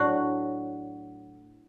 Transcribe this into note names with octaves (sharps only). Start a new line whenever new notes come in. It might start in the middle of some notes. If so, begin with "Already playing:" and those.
Already playing: A2 F#3 D4 F#4